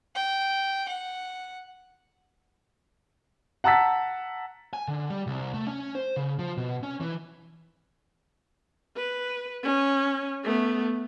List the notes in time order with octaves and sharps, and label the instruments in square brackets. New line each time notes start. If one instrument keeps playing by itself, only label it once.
[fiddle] G5
F#5
[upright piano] F#5 A5 A#5 E6 A6 B6
[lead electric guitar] G#5
D3
G3
C2
A3
C#4
C5
C#3
F3
B2
C#4
E3
[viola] B4
C#4
A3 B3